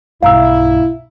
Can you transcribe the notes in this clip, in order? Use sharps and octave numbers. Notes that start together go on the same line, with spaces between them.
B1 G2 E4 F5 A#5 E6